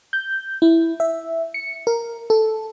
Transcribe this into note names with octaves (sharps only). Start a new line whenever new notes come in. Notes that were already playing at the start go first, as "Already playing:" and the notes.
G6
E4
E5
C#7
A#4
A4